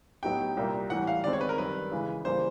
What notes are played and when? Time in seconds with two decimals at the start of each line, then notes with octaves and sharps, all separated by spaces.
0.23 A2 F#3 B3 D#4 G4 G5
0.57 C2 A#2 G3 A#3
0.90 A2 E3 G3 F#5
1.07 F5
1.24 D#3 G#3 C4 D5
1.33 C#5
1.41 B4
1.49 A#4
1.58 F#2 D#3 G3 B4
1.92 C#3 E3 G#3
2.25 C#3 E3 G3 A#3 C5